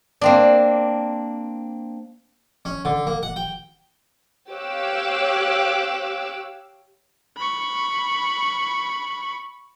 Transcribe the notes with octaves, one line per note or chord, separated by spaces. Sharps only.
A#3 C4 D4
C#4
D3
A#3
F#5
G5
G4 C#5 F5 D6 E6 F#6
B5 C#6